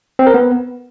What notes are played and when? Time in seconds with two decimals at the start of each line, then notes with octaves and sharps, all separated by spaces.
0.19 C4
0.27 A#4
0.34 B3